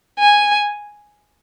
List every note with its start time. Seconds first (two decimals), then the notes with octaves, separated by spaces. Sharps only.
0.19 G#5